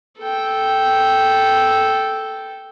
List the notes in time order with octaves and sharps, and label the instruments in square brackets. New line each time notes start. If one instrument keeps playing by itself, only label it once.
[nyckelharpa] A4 G5